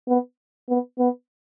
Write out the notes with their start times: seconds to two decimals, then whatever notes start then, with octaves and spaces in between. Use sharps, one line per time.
0.09 B3
0.69 B3
0.99 B3